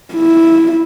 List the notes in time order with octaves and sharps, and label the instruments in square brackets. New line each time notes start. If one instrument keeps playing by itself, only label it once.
[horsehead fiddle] E4